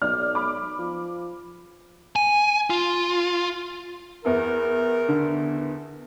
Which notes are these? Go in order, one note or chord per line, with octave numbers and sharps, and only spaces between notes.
B1 D5 F6
B5 D6
F3
G#5
F4
E2 B3 E4 A#4
D3